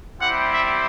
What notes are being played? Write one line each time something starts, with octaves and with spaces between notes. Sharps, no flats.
G3 C4 E4 G4 F#5
E5